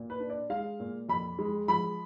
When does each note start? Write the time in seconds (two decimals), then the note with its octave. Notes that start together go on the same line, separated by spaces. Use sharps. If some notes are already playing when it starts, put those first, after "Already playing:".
Already playing: A#2
0.10 B4
0.20 D4
0.30 D5
0.50 G#3 F5
0.80 A#2
1.09 F2 B5
1.39 G#3
1.68 F3 B5